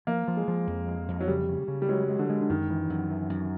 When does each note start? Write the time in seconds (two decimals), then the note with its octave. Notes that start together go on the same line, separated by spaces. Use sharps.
0.07 F3 A#3
0.28 F3
0.37 G#3
0.48 F3
0.67 F2
0.88 G#3
1.08 F2
1.20 F#3
1.28 C#3 G3
1.49 C#3
1.68 C#3
1.82 G3
1.89 F#3 G#3
2.09 G#3
2.19 D3
2.30 G#3
2.41 D3
2.49 F#2 D#3
2.70 E3
2.90 F#2
3.10 E3
3.30 F#2